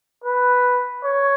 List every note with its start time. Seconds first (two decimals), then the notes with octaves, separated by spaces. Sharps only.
0.24 B4
1.05 C#5